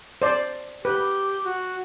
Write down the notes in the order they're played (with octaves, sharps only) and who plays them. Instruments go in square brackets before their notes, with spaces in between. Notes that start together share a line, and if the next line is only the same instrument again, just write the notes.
[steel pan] C5 D5
[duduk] G4 [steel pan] B4
[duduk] F#4